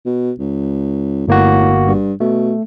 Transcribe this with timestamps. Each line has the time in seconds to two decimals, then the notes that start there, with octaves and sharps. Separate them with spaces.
0.06 B2
0.39 C#2
1.28 G1 A2 A#3 F#4
1.87 G2
2.20 B2 A3